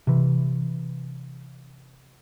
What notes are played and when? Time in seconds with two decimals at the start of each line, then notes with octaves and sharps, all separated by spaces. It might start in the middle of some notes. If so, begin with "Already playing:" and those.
0.07 C3 E3